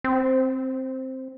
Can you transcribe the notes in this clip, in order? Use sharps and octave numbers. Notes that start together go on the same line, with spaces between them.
C4